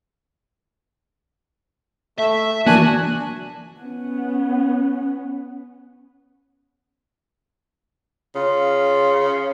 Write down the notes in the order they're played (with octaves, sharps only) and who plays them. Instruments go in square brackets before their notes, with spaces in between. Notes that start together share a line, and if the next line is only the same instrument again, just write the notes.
[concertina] A3 [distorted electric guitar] E5
[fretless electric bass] E3 A#3 [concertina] D4 G#5 F#6 [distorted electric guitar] F#4
[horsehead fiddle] B3 C#4
[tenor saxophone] C#3 [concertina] F4